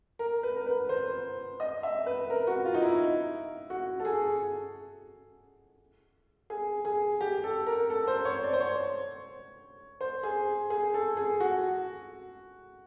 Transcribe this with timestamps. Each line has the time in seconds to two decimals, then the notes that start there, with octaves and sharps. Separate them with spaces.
0.19 A#4
0.43 B4
0.57 A#4
0.66 B4
0.89 C5
1.60 D#5
1.83 E5
2.06 B4
2.30 A#4
2.47 F#4
2.65 F4
2.74 D#4
2.82 E4
3.70 F#4
4.00 A4
4.05 G#4
6.50 G#4
6.85 G#4
7.21 G4
7.44 A4
7.67 A#4
7.90 A4
8.08 C5
8.25 C#5
8.43 D5
8.53 C5
8.60 C#5
10.01 C5
10.23 G#4
10.70 G#4
10.94 A4
11.17 G#4
11.40 F#4